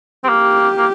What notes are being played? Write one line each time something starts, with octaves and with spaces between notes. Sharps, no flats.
C4
A#3 G4
A#3